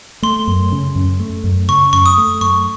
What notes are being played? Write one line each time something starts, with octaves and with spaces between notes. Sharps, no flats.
A3 C6
F#2
C#3
F#2
A3
F#2
C#3 C#6
F#2 C#6
D#6
A3
F#2 C#6